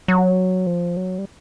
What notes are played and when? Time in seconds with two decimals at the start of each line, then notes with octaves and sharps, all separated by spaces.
0.08 F#3
0.67 F3
0.97 F#3
1.18 G3